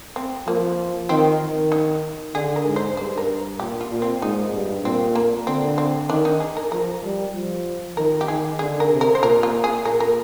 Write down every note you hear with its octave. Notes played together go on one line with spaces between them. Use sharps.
C4
F3 A#3
D#3 C4
D#3
D#4
D3 G#4
A#4
G#2
C5
G2 C5
A#4
A#2 G4
F4
A#2
C4
G#2 D#4
G2
A#2 C4
A#3
D3 C4
C4
D#3 D4
D#4
G#4
A#4
F3 A#4
G3
F3
D#3 A#4
G4
D#3 G#4
D3 G#4
A#4
C3
A#4
C5
A#2 A#4
F4
G#4
A#2 A#4
A#4